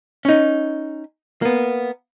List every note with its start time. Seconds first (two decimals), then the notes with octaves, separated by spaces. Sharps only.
0.25 C#4 D#4
1.42 A#3 B3